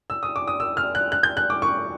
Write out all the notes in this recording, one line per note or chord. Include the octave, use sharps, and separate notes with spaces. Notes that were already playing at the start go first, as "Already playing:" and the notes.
E6
D#6
D6
D#6
E6
F6
F#6
F#6
G6
F#6
D6
C#6